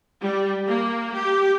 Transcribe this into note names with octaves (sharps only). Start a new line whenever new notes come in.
G3
A#3
G4